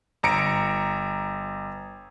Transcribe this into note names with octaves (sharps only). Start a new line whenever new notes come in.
G1 A#5 C#7 D7